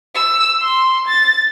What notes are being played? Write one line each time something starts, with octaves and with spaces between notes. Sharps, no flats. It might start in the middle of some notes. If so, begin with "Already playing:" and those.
E6
C6
A6